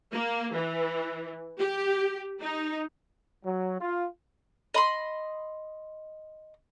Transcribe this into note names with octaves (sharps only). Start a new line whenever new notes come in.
A#3
E3
G4
D#4
F#3
F4
D#5 B5 C6